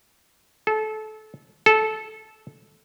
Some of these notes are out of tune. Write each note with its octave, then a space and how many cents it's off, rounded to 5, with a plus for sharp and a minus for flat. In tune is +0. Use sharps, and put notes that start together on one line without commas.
A4 -25
A4 -15